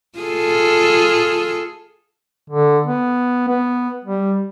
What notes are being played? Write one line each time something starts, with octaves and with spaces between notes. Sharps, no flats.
F4 G#4 A4
D3
B3
B3
G3